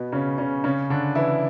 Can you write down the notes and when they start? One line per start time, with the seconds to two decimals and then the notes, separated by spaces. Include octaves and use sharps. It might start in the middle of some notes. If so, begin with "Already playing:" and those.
Already playing: B2 B3
0.12 C#3 C#4
0.38 C#3 C#4
0.64 C#3 C#4
0.90 D3 D4
1.15 E3 E4